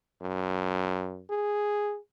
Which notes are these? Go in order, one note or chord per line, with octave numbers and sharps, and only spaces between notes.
F#2
G#4